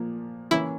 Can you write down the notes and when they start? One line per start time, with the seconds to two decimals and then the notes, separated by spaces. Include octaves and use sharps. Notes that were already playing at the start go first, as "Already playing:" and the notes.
Already playing: A#2 F3 A#3
0.51 E3 A#3 C#4 E4